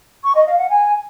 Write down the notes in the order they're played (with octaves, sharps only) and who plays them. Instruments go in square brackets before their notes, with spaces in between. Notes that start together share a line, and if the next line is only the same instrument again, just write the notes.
[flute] C#6
D#5
F5
F#5
G#5